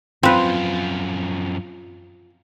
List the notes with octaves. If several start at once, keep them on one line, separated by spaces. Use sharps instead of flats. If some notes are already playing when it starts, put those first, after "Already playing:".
F#2 F3 C4 F4 B4